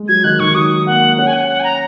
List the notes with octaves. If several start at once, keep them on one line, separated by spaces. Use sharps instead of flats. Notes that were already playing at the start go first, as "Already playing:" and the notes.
Already playing: G#3
F#3 G#6
D#3 F#6
D#3 C#6
F#3 D#6
A#3 F#5
C#4 F#5
G#5
F#5
F#5
G#5
A#5